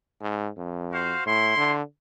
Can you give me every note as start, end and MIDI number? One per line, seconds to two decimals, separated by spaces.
0.21 0.49 44
0.57 1.14 41
0.93 1.26 66
0.93 1.26 72
0.93 1.26 77
1.26 1.56 45
1.26 1.73 64
1.26 1.73 84
1.57 1.82 50